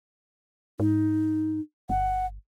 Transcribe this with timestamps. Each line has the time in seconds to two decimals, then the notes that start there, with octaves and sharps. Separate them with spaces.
0.80 G#2 D#4
1.89 G1 F#5